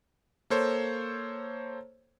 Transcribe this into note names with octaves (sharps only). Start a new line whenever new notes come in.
A#3 A4 C5 C#5